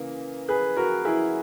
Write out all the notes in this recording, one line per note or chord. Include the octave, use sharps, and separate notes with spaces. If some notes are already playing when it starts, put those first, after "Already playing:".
Already playing: C#3 E3 A#3
G#4 B4
F#4 A#4
E4 G#4